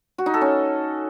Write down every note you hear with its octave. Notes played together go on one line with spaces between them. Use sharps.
F#4
D#4
A4
C#4